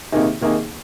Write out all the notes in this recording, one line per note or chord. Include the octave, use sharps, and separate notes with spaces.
C3 D#3 A#3 D#4 G#4
C3 D#3 A#3 D#4 G#4